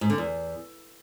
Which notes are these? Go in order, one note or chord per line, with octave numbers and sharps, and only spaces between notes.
G#2
D3
E2